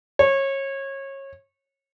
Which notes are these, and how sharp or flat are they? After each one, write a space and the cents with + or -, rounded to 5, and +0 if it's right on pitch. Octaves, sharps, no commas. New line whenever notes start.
C#5 -25